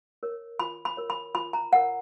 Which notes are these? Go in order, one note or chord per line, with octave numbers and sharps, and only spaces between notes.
A#4 C#5
F4 B5
B5
A#4 C#5
B5
F4 B5
A#5
A#4 C#5 F#5